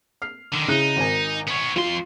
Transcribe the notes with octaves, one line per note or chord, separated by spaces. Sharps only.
F6 C7
D3 D#3
C#3 D#4 E4 F#6
G#1 A#4 G#5
B3 C#5
F2 F4 C6